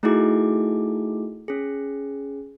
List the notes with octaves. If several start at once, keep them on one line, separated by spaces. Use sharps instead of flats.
A3 D#4 E4 F#4 G#4 D6
C#4 G#4